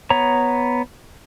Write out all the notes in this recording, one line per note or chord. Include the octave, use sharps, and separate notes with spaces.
B3 C#5 A#5